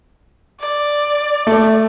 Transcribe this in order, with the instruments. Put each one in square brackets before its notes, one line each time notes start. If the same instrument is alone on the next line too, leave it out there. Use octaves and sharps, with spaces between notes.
[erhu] D5
[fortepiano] A3